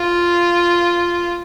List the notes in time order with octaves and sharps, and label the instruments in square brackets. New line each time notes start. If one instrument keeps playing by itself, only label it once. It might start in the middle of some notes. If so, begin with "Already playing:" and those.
Already playing: [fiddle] F4